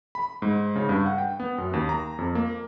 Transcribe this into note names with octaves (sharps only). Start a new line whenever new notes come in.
B5
G#2
C#3
G2
F#5
G5
B3
F#2
D#2
A#5
F2
A#3